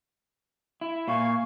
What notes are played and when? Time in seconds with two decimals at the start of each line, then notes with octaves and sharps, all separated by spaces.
0.81 E4
1.08 A#2 F5 G#5 C#6